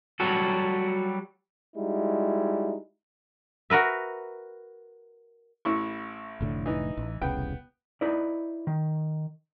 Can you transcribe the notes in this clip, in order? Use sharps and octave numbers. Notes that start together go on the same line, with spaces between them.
F#3 G3 F#4 A4
G3 G#3 D#4 E4 F#4
F#4 A#4 B4 E5
A1 E4 C#6
F1 A2 D3
E3 D#4
A1
E1 C2 C#3 B3 G5
D#4 E4 B4 D5
D#3